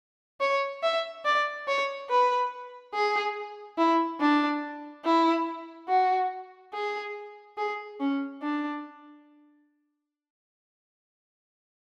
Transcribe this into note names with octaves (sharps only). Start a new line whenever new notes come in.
C#5
E5
D5
C#5
B4
G#4
E4
D4
E4
F#4
G#4
G#4
C#4
D4